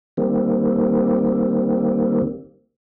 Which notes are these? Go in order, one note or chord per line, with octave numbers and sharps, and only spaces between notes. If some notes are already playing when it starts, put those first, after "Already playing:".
D#3 G3 A#3 C4